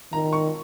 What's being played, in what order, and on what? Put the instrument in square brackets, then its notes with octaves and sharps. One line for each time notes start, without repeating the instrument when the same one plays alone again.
[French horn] D#3 [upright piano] A#5
[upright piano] C#6